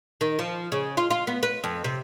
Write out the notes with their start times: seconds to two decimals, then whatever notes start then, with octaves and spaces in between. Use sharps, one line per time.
0.21 D#3
0.39 F3
0.72 C#3
0.97 F4
1.10 F4
1.27 B3
1.43 B4
1.64 F2
1.84 C3